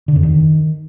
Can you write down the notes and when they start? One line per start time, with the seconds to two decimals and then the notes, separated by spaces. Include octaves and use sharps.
0.08 D3
0.16 F2
0.23 D#3